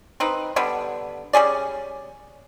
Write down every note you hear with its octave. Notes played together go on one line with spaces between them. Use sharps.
C4 D#4 B4
D3 G3 B3
G3 C#4 G#4 D5